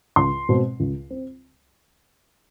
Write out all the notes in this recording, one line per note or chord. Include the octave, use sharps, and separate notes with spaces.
C#2 C6
B2 G#3 C4
C#2
C4